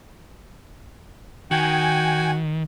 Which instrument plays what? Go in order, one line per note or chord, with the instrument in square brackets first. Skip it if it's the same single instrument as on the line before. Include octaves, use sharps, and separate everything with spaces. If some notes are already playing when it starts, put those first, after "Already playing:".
[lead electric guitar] D#3 [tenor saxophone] F#4 [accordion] G5 G#5